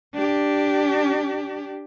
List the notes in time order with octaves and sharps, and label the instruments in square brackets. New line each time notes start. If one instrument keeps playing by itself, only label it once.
[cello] D4 G4